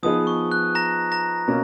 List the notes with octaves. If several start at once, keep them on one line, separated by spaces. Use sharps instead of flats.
F3 B3 D#4 G#4 B4 D#6
C#6
F#6
A#5 A#6
A#5 A#6
B2 A#3 C#4